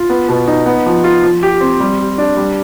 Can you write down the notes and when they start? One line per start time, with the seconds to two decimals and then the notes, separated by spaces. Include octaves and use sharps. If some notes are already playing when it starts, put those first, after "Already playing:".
Already playing: F4
0.10 B3
0.29 B2
0.48 D#4
0.66 B3
0.86 F3
1.04 F4
1.23 F3
1.43 G4
1.61 C4
1.80 G3
1.99 G4
2.18 D4
2.37 G3